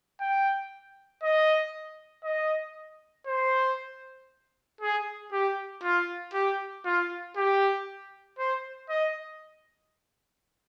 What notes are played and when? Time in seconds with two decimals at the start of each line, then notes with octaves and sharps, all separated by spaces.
0.21 G5
1.23 D#5
2.24 D#5
3.27 C5
4.81 G#4
5.32 G4
5.83 F4
6.34 G4
6.85 F4
7.37 G4
8.39 C5
8.90 D#5